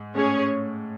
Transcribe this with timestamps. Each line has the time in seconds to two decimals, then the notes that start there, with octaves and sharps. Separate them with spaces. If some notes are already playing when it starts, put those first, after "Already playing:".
Already playing: G#2
0.15 A2 C#4 G#4 C#5